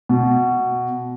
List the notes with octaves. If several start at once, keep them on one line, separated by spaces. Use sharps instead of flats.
B2